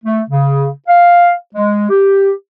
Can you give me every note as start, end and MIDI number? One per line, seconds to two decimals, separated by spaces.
0.05 0.20 57
0.29 0.70 49
0.88 1.33 77
1.55 1.85 56
1.90 2.30 67